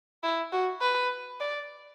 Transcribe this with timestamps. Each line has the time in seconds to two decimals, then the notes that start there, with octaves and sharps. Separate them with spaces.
0.23 E4
0.52 F#4
0.82 B4
1.40 D5